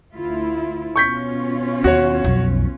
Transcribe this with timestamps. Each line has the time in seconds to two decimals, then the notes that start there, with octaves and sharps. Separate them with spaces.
0.13 D2 E4 F4
0.96 B2 C#4 F4 C#6 G6 B6
1.84 D#2 F#4 C#5
2.24 B1 F2